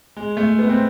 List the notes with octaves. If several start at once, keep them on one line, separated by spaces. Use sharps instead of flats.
G#3
A3
B3
C4